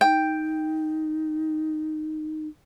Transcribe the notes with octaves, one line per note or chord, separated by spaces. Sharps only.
D#4 G5